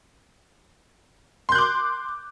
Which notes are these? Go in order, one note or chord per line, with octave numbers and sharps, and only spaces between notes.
C6 D6 F#6 G6